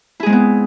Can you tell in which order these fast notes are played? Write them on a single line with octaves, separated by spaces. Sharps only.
E4 G#4 G#3 C4 B3